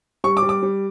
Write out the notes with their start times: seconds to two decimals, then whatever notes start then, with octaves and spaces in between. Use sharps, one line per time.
0.24 G3 C#6
0.37 D6
0.43 G3
0.49 D6
0.63 G3